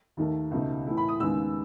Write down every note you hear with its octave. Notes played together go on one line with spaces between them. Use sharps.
D#2 D#3 A3
C#2 B2 A3 D#4
A2 E3 A3 E4
B5
D#6
D#2 C#3 G#3 B3 D#4 E6